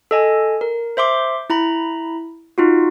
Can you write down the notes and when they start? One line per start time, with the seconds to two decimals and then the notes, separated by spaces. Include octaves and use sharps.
0.11 A4 D#5 G#5
0.61 A#4
0.97 C5 E5 C6 D6
1.50 E4 A#5 B5
2.58 D#4 F4 F#4